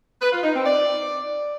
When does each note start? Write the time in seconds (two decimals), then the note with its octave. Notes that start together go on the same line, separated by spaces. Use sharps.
0.21 B4
0.32 F4
0.43 D#4
0.54 C4
0.65 D5